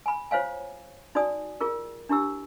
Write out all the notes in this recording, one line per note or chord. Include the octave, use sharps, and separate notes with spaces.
G#5 B5
F4 C5 C#5 F5 G#5
D#4 F#4 D5 G#5 D#6
F4 G#4 A#4
D4 E4 G4 E6